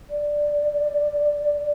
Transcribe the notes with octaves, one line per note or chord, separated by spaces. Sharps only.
D5